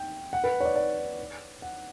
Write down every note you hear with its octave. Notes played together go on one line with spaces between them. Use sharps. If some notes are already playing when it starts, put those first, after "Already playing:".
Already playing: G5
F#5
B4
C#5
D5
D5
F#5